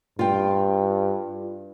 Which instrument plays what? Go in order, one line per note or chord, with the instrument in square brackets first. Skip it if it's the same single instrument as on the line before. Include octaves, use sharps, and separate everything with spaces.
[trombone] G2 [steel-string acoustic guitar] F4 G5